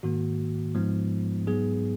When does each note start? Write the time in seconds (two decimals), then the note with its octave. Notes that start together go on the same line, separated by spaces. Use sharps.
0.03 G#2 D#3 A#3 F#4
0.75 G#2 F3 G#3 B3
1.47 G#2 F#3 B3 G#4